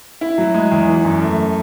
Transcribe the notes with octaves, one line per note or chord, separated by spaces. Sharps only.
E4
F#3
G#3
E2
E3
F#2
A3